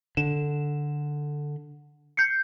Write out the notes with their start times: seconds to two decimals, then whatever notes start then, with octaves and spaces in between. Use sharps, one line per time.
0.17 D3 E7
2.17 G6 C7 C#7